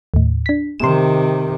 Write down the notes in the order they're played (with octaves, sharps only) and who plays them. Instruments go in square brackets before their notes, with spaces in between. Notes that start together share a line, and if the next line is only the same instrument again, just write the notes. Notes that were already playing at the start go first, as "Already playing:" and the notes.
[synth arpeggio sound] D#2 A2
D4 B6
[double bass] C3 D#3 [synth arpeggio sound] C6 E7